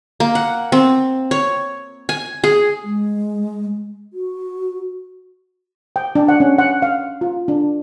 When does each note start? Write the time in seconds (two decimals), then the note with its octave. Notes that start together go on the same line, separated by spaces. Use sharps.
0.20 A#3
0.35 F#5
0.72 C4
1.31 C#5
2.09 G#5
2.44 G#4
2.82 G#3
4.13 F#4
5.96 G5
6.15 D4
6.28 F#5
6.40 C#4
6.58 F#5
6.82 F5
7.21 F4
7.48 D4